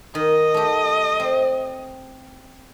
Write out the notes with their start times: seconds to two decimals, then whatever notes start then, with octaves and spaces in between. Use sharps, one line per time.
0.15 D#3 D#5
0.54 A3 G4
1.20 C4